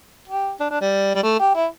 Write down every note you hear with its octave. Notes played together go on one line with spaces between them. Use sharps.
G4
D4
D4
G3
G3
A3
G4
E4